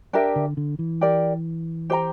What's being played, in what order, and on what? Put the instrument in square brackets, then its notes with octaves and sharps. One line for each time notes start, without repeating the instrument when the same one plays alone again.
[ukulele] D4 G4 A#4 E5
[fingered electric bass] D3
D3
E3
[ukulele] G4 A#4 D5
G4 C5 G5 A#5